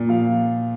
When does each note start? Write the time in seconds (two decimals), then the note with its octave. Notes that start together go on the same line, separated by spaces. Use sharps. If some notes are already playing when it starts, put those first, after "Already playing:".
Already playing: A#2
0.09 F3 F5